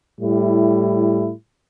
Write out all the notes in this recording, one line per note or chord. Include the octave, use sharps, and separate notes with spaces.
A2 G3 E4